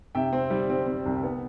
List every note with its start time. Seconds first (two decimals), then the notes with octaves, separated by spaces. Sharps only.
0.15 C3 E5 G5
0.33 C4
0.50 G3
0.70 C4
0.87 C4
1.06 C2
1.23 B3